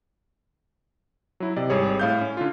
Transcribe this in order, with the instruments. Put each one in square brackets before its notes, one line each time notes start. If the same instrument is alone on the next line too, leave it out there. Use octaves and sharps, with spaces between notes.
[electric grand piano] F#3 E4
C3 D5 D#5
G#1 G3 G#4 C#5
A2 F5 G6
C#4
D3 F4